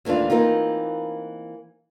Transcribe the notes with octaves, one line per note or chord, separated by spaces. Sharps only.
D#2 E3 A3 D4 F4
E3 A#3 C4 D#4 F4